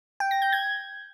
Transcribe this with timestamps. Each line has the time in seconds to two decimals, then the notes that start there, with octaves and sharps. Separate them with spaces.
0.20 G5
0.31 A#6
0.42 G6
0.52 G#6